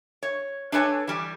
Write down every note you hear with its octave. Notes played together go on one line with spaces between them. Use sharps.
C#5
D4 A4 B4 C#5 G#5
E3 G3